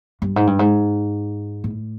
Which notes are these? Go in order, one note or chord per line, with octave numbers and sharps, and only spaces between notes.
G2
G#2
G2
G#2
A2